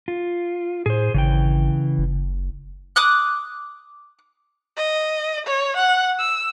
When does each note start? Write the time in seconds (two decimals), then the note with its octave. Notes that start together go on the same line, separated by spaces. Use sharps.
0.08 F4
0.86 A2 G#4 C5
1.14 G#1 C#3 E3 G5
1.98 F#1
2.96 D6 D#6 F#6
4.77 D#5
5.47 C#5
5.77 F#5
6.19 E6